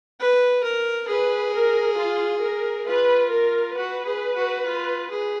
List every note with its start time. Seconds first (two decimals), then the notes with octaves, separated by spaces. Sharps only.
0.20 B4
0.63 A#4
1.08 G#4 B4
1.53 A#4
1.97 F4
2.42 A#4
2.86 F4 B4
3.31 A#4
3.76 F#4 B4
4.05 G#4
4.35 F#4
4.66 F4
5.10 G#4